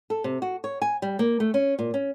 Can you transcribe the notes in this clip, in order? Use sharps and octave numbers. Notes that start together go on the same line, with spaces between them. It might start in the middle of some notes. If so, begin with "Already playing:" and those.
A4
C3
F#4
C#5
G#5
G3
A#3
A3
C#4
A#2
C#4